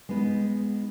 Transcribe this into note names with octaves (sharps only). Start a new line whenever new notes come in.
G#3 B3 D#4 B4